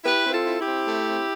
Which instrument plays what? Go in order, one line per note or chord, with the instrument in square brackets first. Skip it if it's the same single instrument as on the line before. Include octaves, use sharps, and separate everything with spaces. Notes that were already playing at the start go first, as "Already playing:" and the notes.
[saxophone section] E4 G4 B4
C4
F4 A4
E4
E4 G4
C4
A3
C4